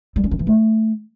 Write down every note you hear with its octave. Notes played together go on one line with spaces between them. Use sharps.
G3
C#4
D#3
E3
A3